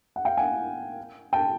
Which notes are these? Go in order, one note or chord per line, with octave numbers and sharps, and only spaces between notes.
F#5
F5 G5
F#5 G#5
G5 A5